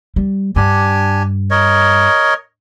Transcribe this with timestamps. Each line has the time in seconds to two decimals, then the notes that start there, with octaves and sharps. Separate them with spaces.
0.16 G3
0.56 G2 D4 G4 G#5
1.50 A#4 C#5 D#5